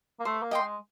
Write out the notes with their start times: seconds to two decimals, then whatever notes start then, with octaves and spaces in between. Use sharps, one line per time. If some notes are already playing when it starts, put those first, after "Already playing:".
0.20 A#3
0.25 A3 C5
0.42 A#3
0.51 D#5 G5 C6
0.60 G#3